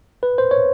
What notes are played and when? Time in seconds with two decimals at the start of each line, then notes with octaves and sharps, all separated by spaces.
0.23 B4
0.38 C5
0.51 C#5